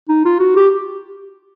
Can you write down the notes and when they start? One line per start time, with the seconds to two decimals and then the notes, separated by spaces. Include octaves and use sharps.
0.09 D#4
0.25 F4
0.39 F#4
0.56 G4